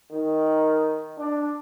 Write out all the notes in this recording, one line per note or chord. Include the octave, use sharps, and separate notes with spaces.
D#3
D4